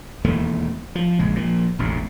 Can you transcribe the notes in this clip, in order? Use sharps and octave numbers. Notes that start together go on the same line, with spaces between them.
E1 D#2 E3 A3
F3
A#1 C#3 G#3
A#2 F3
E1 A1 F2 A2